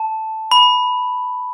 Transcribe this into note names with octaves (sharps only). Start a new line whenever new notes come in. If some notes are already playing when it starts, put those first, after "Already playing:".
Already playing: A5
B5